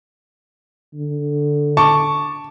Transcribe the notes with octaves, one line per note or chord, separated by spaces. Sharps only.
D3
A5 C#6 D6